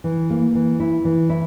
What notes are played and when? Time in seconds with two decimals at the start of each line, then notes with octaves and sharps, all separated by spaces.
0.04 E3
0.30 A#3
0.55 E3
0.80 E4
1.05 E3
1.30 E4